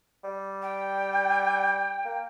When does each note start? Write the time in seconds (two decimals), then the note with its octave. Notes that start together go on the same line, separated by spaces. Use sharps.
0.24 G3
0.62 G5
2.05 A#3